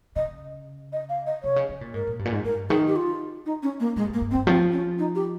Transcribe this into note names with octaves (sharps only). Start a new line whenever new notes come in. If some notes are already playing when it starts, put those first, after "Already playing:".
C#3 D#5
D#5
F5
D#5
C3 C#5
C#3
C#3
A#2
G#2 A#4
A#2
G2
A#2
G#2
G2 A#4
D#3 G#4
G4
F4
D#4
C#4
A#3
A#2 G#3
G2
G#2 A#3
G2
C4
G2
F3 C4
C#4
D#4
G4